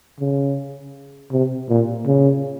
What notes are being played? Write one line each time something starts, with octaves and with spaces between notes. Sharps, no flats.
C#3
C3
A#2
C#3